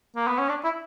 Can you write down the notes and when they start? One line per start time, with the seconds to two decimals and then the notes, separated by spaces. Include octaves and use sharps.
0.16 A#3
0.27 B3
0.38 C#4
0.49 D4
0.64 E4